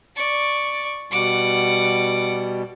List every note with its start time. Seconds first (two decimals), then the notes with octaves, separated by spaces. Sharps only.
0.16 D5 C#6
1.11 B2 G3 F#5 D6